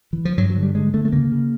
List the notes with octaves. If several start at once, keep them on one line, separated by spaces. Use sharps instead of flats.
E3
F3
G2 F#3
F#3
D3
G3
D3 G#3
D3 A3
A3
C#3 A#3
C#3